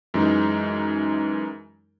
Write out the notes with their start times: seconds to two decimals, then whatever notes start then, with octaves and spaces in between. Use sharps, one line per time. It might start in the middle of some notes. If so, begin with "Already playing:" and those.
0.14 F#2 E3 G#3 D#4